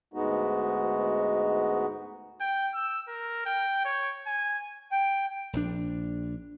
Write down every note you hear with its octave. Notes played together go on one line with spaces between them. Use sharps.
D2 G#2 G#3 B3 D#4 F#4
G5
E6
A#4
G5
C#5
G#5
G5
A#1 E3 D4